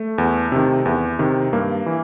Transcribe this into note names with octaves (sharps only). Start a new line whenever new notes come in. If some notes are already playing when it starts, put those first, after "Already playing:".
Already playing: A3
E2
C3 D#3
E2
C3 D#3
G2 A#3
E3